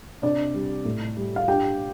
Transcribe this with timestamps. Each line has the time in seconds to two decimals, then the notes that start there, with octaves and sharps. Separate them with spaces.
0.22 C3 D4 D5
0.54 G3
0.85 A2
1.17 G3
1.36 F5
1.48 G2 G4 G5